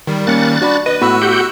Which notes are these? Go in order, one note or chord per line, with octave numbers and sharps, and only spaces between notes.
D#3 G3
A#3 C#4 F#6 A6 C#7
D4 F#4 D5 B5
B4 D#5 D#7
A2 B3 F#4 B5 E6 F#6
G4 F#5 G6